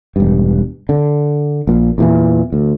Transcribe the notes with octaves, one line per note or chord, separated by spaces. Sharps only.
E1 G2
D3
A#1 A#2
E2 A#2 E3
D2